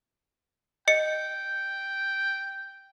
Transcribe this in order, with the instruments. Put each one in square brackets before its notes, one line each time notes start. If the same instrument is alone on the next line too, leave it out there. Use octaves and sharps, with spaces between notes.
[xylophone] D#5 C#7 [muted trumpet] G5